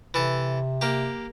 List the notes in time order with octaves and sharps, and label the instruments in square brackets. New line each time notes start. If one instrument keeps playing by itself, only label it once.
[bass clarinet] C3 [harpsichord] E3 A4
[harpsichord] A#3 G4